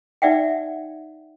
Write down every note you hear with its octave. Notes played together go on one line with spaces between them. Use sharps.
D#4 D5 E5 F#5 G5